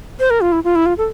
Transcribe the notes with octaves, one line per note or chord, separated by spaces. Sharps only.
C5
A#4
F4
E4
F4
E4
F4
A4